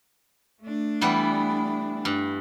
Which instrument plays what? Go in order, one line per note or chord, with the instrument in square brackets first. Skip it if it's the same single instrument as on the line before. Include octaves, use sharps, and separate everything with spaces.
[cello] A3 D4
[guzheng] E3 G3 B3
G2